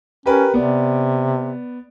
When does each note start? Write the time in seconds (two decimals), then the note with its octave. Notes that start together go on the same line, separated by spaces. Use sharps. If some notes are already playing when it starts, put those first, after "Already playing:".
0.26 C#4 G4 A#4 B4
0.54 C3 B3 D5